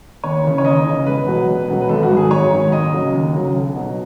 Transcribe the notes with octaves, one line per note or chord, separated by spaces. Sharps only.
D#2 C#5
C#3 E3
C#5
D#2 D#5
C#3 E3
E1 B4
E2 B2 F#3
E1
E2 B2 F#3
B4
G#1 A4
F#4
G#2 D#3 F#3
G#4
G#1 C#5
G#2 D#3 F#3
D#2 D#5
C#3 F#3
D#2
C#3 F#3
B1
B2 F#3